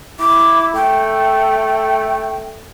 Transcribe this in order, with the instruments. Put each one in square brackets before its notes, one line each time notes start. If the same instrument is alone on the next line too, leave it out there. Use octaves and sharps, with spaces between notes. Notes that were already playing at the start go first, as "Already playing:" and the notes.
[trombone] E4 [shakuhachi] D6
[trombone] A3 [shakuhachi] G5